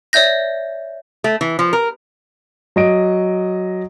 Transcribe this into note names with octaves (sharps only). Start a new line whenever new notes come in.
C#5 D5 E5 G6 A#6
A3
E3
F3
A#4
F#3 D#5 D7